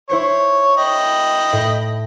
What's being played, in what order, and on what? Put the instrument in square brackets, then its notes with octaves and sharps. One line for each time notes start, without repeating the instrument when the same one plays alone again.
[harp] E4 C5 C#7 [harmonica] C#5
[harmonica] D#5 G5 B5
[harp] A2